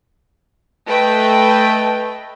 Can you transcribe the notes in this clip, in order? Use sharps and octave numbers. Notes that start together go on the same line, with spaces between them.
A3 B4 D#5 G5